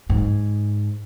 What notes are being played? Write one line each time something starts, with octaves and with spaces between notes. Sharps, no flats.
G#2